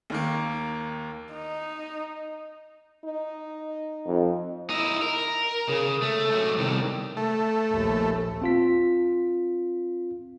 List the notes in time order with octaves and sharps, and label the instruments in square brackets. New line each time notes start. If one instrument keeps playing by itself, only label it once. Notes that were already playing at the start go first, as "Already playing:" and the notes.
[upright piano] D#2 D#3 A#3
[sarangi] D#4
[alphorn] D#4
[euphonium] F2
[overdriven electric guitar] D#4 E4
A#4
C#3
A3
F#3 A3
C2 D#3
[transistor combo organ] A3
[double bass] A#1 D#2
[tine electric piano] C4 F4 B6